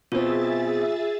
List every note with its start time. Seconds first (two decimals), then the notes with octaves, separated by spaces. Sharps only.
0.12 B2 C4 F4 G#4 E5 A6